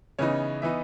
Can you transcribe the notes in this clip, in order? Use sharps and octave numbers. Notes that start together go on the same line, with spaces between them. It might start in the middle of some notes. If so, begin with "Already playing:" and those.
C#3 E3 B3 D#4 C#5
E3 B3 D#4 E5